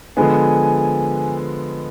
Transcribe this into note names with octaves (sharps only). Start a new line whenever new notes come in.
D3 F3 G#3 B3 G#5